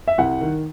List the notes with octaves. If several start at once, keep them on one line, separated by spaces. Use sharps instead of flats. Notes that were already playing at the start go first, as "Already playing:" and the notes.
E5
C2 F#5
D#3